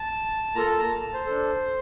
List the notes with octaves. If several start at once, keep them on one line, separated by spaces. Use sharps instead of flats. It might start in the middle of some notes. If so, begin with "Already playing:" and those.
Already playing: A5
A#3 F4 A4 A#5
A5
A#5
A5
A5
C5
D4 A4